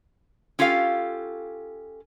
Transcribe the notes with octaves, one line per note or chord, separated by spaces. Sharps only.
C#4 F4 G4 A4 F5